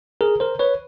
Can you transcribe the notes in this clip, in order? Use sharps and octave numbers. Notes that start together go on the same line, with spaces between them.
G#4 A#4
A#4 C5
B4 C#5